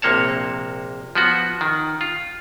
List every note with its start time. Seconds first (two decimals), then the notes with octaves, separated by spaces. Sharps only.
0.02 A#1 C3 A#3 C#5 A5
1.15 F3 B3 F#4
1.61 D#3
2.01 F4